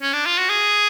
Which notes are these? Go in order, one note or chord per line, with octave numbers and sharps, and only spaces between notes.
C#4
D4
F4
F#4
G#4